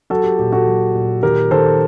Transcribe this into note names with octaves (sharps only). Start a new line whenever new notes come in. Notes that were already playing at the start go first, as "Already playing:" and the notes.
F#3 F#4 A4
G4
A#2 G4
F#4 A4
F#3
A#2
D#3 G4 A#4
D#3 A4 C5